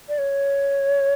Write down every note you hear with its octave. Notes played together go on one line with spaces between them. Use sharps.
D5
C#5